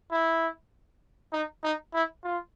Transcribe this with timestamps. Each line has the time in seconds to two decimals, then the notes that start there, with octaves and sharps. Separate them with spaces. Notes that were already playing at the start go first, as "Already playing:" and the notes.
0.12 E4
1.33 D#4
1.63 D#4
1.94 E4
2.23 F4